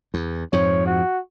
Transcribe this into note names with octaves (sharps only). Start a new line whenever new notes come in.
E2
F2 G#2 F3 C#5
F#4